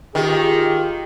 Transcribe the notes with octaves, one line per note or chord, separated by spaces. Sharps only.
D#3 F4 G4 G#4